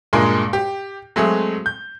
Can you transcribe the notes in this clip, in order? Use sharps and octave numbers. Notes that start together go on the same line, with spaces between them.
G2 A#2 G#3 A#4 G#5
G4
F#3 G#3 A3 C4 G#4
G6